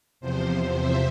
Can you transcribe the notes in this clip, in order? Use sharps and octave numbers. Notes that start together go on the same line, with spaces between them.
E2 C3 F3 C5
E5